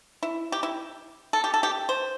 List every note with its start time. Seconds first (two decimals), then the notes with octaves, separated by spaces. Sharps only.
0.23 E4
0.52 G4
0.63 E4
1.33 A4
1.44 G4
1.54 A4
1.63 G4
1.89 C5